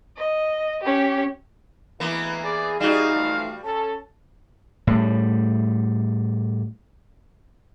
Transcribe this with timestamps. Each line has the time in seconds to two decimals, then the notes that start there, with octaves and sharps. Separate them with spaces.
0.17 D#5
0.83 C#4 G4
2.00 D2 E3 G#3 A#3 B3 E4
2.44 G#4 D5
2.80 G3 D#4 F#4 G#4 F5
3.14 E3 F3 A3
3.64 C#4 A4 A5
4.87 A2 G3